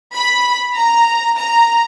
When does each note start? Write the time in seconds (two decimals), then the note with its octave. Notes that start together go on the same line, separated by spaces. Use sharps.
0.15 B5
0.76 A#5
1.38 A#5